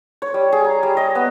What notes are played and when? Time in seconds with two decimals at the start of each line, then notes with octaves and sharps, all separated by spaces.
0.22 C#5
0.34 G3
0.52 G#4
0.65 A#5
0.83 G3
0.97 D#5
1.15 B3